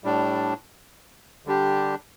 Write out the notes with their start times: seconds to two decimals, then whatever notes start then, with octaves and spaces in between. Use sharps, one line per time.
0.04 A2 G3 D4
1.45 D3 G3 D4 G4